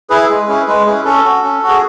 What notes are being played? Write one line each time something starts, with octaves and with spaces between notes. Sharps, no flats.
E4 G#4 B4
G#3
C#4 E4 G#4
G#3 B4
C#4 E4 G#4
C#4 A4
F#4
C#4
F#4
G#4